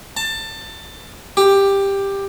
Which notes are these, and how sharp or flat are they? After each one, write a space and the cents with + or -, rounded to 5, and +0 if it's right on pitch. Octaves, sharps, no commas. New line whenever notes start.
A5 +20
G4 +10